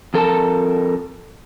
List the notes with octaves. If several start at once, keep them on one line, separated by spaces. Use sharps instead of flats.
F2 A4 A#4 A5